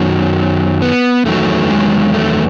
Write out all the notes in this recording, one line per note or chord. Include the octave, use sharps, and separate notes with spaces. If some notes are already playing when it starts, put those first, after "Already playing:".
Already playing: F#2 D#3 F#3
B3
E2 D#3 F#3 A3
G#3
A3